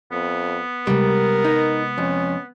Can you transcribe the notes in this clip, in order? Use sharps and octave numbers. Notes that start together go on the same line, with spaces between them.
F2 B3
C3 G3 G#3 A#4
D#4
F2 C#4